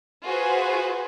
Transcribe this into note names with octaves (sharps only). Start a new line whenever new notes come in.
F4 F#4 G#4 B4 C5 G#5